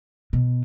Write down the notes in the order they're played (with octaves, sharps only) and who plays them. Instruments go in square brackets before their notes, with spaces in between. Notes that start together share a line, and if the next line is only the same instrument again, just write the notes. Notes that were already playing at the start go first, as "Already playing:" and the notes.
[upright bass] B2